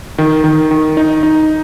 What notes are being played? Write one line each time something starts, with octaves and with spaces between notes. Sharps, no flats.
D#3
D#3
D#3
D#4
D#4